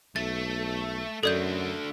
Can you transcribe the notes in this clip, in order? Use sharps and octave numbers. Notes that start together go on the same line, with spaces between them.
B1 A3 A6
F#2 D3 A3 A4 D5 G6